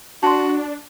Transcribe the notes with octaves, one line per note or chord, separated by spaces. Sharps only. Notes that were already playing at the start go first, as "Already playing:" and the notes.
D4 F#4 A5 C6